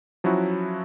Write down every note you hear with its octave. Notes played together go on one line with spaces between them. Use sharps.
F3 F#3 C#4 E4 F#4